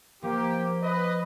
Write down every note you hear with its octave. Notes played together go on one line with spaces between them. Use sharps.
F3 A#3 G4
B4 D#5